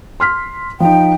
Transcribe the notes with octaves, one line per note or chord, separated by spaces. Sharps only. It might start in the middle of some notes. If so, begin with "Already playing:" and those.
C6 F6 B6
F3 D#4 G5